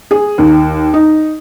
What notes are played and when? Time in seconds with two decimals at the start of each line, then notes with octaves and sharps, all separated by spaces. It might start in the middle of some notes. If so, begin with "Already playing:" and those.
0.11 G#4
0.38 D#2
0.93 D#4